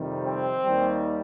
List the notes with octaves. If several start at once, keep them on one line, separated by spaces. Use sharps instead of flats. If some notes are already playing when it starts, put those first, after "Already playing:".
Already playing: F2 C3 D#3 G3
C4
D#2 D#3 G3